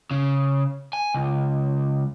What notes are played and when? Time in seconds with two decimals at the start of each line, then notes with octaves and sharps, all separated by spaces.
0.11 C#3
0.93 G#5
1.14 C#2